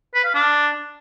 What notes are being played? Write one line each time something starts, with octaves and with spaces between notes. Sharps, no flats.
B4
F5
D4